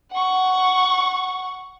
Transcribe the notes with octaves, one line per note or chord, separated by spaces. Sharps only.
F#5 C#6